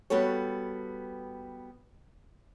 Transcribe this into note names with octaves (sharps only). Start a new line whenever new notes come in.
G3 B3 F#4 A4 C#5